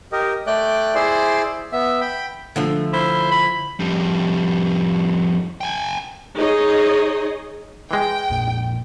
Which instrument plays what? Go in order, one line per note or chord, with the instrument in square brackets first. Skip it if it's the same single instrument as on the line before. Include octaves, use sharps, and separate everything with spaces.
[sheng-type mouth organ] G4 A#4 D#5
A3 D5 G5 F#6
E4 G#4 C5 D5 C6
B3 E5
G5 B5
[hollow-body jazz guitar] D3 F3 A3
[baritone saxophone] E4 [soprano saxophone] C5
[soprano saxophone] B5
[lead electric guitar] F2 G3
G5 G#5
[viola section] D#4 G#4 C#5 D#5
[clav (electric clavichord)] E3 G#3 [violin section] G5
[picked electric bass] A#1 F2 A#2